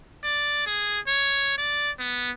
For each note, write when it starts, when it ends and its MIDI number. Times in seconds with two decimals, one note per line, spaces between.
0.24 0.62 74
0.67 0.99 68
1.07 1.53 73
1.58 1.90 74
1.99 2.30 59